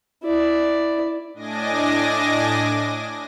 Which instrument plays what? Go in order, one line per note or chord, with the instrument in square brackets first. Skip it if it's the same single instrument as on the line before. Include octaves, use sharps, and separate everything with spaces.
[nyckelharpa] E4 D5
[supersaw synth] A2 D4 D#5 G#5 D6 A#6